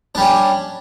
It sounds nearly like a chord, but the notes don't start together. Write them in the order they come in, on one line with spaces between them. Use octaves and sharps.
D4 G3 C#4